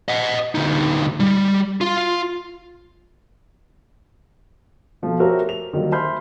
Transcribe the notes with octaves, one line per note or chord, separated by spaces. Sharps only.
D#5 F#5
D2 D#4
G3
F4
B2 F3 A3
F#4 G4 A#4 C5 C#5 E5
F7
D#3 F#3 G3 A#3
C5 E5 B5 C6 F6 G6